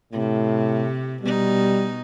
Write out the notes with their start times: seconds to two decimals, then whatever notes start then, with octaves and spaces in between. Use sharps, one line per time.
0.13 A2 C3
1.23 B2 G3 D#4